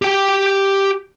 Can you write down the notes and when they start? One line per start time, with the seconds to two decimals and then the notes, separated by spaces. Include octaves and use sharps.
0.02 G4 G5